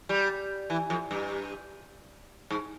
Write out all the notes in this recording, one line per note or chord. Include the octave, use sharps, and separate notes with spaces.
G3
E3
F2
G2
G#2